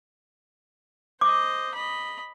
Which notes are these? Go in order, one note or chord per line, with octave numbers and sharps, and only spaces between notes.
C5 D#5 D6
D#5 B5